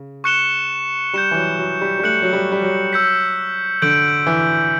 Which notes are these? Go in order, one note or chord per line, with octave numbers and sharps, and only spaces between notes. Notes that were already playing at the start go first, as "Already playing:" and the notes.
Already playing: C#3
C#6 F#6 C#7 E7 G7
G3 G6 C#7 E7
E3
F#3
F#3
G3
G3
A3 F#6 C#7 F#7
F#3
G3
G3
F#3
E6 G6 B6
D3 G6 D7 F#7
E3